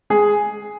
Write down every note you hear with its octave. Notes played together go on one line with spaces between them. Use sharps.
G#3 G#4